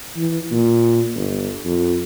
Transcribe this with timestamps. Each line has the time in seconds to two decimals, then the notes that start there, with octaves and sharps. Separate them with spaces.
0.17 E3
0.51 A#2
1.15 G1
1.65 F2